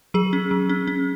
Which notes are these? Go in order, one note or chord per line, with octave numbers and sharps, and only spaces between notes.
F#3 G#4
C#4
F#3
C#4
C#4